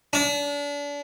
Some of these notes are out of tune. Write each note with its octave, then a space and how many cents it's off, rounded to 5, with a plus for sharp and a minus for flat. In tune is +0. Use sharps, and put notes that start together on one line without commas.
D4 -35